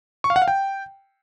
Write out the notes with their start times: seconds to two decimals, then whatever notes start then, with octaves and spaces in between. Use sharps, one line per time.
0.24 C#6
0.30 F5
0.36 F#5
0.42 F5
0.48 G5